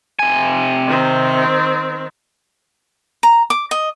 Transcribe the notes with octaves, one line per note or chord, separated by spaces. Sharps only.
C3 G#5
D#3 C4
A#5
D6
D#5